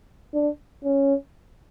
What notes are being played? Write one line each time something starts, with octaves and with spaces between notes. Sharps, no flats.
D4
C#4